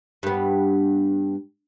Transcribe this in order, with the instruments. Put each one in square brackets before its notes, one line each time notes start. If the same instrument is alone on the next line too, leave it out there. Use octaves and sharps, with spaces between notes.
[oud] G2 B3